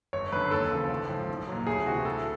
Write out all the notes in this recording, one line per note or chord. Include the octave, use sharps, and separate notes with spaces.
G1 C#5
F#2 D3 B4
D#2 A4
C#3 F3
A1
G#2 F3
B1
A#2 F#3
D2 G#4
C3 E3 F#4
D2 A4